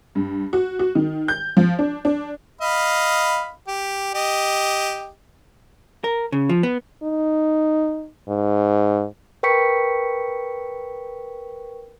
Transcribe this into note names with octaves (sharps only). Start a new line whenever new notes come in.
G2
F#4
F#4
D#3
G6
F3
D4
D4
D#5 F5 B5
G4
G4 D#5
A#4
C#3
F3
B3
D#4
G#2
A#4 B4 G5 C#6 B6 C#7